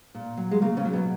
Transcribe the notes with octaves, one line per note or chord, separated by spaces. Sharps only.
A#2
F#3
G#3
C#3 A#3
C#3 C#4
F#3
B2 B3